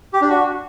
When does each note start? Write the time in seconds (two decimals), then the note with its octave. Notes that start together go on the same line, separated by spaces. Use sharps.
0.13 G4
0.22 D4
0.30 F#4